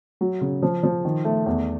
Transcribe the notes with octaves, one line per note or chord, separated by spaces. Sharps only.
F#3
C#3
F3
F3
D#3
A3
E2